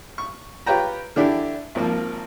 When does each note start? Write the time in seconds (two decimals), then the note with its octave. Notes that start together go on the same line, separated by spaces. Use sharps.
0.18 C#6
0.66 F4 G4 B4 C#5 G5 A#5
1.16 D3 E3 D4 E4 G4
1.75 G#1 F3 A#3